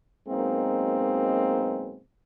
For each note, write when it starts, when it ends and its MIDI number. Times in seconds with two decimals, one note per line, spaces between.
0.28 2.00 42
0.28 2.00 47
0.28 2.00 56
0.28 2.00 58
0.28 2.00 60
0.28 2.00 63